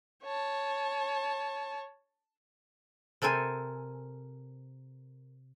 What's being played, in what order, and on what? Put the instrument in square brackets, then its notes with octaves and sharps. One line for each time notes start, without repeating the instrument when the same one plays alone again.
[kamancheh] C#5 A5
[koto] C3 A4 A#4 C5 G#5